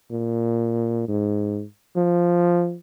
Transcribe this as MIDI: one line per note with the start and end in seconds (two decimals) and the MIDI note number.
0.11 1.07 46
1.08 1.63 44
1.96 2.76 53